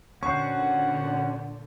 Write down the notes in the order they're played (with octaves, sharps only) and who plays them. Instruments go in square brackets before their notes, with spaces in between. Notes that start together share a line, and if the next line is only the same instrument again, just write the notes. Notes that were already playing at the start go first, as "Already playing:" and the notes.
[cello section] A#2 D3 [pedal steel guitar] C#4 F#4 C5 [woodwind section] F#5 [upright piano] C#6